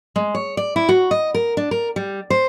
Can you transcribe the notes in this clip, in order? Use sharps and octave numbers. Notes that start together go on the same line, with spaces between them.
G#3
C#5
D5
E4
F#4
D#5
A#4
D4
A#4
G3
C5